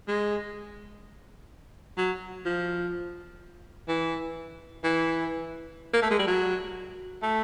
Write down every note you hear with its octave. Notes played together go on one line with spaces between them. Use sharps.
G#3
F#3
F3
E3
E3
A#3
A3
G#3
G3
F#3
A3